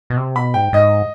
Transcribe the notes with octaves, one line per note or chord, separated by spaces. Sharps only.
B2
C3
B2 B5
G#2 G5
G#2 D#5